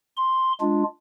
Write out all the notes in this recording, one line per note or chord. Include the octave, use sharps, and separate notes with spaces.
C6
G#3 D4 F4